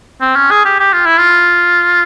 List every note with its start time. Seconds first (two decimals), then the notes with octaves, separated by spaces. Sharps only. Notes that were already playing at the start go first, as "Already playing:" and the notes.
0.21 C4
0.36 C#4
0.51 G#4
0.65 G4
0.80 G4
0.93 F4
1.06 E4
1.18 F4